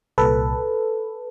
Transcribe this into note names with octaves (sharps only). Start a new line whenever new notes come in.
C2 A#2 A4 B4